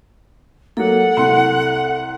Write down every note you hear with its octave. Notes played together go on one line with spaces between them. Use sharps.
F#3 A#3 A4 F#5
C2 C6 F#7